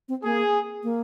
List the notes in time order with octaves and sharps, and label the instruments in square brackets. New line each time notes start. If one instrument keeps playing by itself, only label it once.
[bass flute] C4
[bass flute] A#3 [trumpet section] G#4
[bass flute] A#3